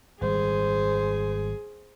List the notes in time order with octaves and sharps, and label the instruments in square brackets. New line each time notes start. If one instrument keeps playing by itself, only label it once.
[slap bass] G#1 G3 [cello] G#4 [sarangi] C5